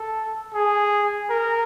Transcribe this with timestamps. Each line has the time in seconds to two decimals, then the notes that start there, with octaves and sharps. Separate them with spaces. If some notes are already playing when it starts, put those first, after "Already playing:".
Already playing: A4
0.54 G#4
1.30 A#4